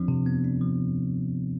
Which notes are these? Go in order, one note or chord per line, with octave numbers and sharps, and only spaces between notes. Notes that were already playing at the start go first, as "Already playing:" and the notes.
Already playing: F3 C4 D4
C3
B3
D4
F3